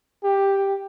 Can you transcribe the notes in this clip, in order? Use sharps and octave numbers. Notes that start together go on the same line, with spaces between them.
G4